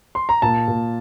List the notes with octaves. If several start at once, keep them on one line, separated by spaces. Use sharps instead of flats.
C6
A#5
A#2 A5
A#2